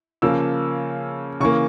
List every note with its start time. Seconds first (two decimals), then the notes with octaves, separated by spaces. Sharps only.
0.22 C#3 F3 A#3 E6
1.40 C#3 E3 A#3 C#6